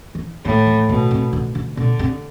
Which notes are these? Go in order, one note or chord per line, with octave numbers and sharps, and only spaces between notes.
E3
A2 D3
E3
B2 D3
C3
D3
D3
B2 D3
C3